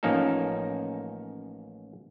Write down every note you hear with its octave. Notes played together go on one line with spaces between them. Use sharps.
A1 F3 A#3 C#4 D#4 A4